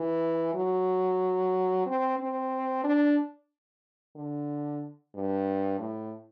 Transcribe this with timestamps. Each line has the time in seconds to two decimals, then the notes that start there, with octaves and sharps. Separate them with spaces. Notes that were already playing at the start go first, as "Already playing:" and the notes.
Already playing: E3
0.55 F#3
1.86 C4
2.19 C4
2.84 D4
4.16 D3
5.15 G2
5.79 A2